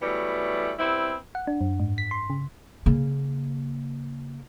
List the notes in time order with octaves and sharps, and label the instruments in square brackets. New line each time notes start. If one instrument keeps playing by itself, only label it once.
[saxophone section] E3 F#3 G3 A3 B3
G3 B3 C4 E4
[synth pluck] F#5
D4
F#2
G#2
B6
C6
C#3
[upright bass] C#3 A#3